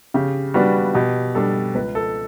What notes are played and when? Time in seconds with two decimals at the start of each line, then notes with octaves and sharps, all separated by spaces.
0.14 C#3 G4
0.54 G3 B3 D4 F#4
0.94 B2 G4
1.35 G3 D4 A4
1.75 C#2 B4
1.95 A4